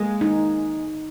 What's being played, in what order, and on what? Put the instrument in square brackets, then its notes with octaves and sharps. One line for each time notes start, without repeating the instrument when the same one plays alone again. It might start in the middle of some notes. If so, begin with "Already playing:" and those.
Already playing: [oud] G#3 A#3
[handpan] D#4